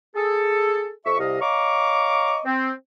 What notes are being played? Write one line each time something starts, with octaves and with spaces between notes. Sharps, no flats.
G#4 A4
F2 E5 C#6
C2 C3 D#5 F5
C#5 D#5 F5 A#5 C#6 D6
C4